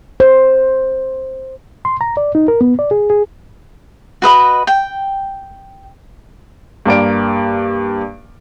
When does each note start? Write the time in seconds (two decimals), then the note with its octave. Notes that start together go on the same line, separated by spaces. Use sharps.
0.20 C5
1.85 C6
2.01 A#5
2.17 D5
2.35 D#4
2.48 A#4
2.61 B3
2.79 D5
2.91 G#4
3.10 G#4
4.22 F#4 B4 D#5 B5
4.67 G5
6.86 G2 A#3 D5 D7